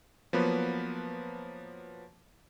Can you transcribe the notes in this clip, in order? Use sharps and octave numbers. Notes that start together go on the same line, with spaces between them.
F3 F#3 A#3 B3 B4 C#5